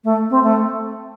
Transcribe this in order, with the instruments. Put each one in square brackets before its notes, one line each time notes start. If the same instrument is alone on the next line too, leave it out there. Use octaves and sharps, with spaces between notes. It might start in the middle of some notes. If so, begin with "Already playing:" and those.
[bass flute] A3
C4
A3